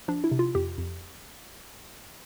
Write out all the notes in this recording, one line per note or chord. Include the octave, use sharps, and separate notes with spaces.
F3 D4
E4
C3
F4
F2 G4
F2